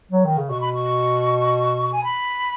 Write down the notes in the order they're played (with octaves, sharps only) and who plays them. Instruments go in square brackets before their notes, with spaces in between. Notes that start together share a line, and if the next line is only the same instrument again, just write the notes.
[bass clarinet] F#3
D#3
C#3
[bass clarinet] B2 [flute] C#6
[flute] B5
C#6
G#5
B5